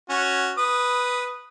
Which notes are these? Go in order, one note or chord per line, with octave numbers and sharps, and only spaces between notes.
C#4 F#4
B4 D#6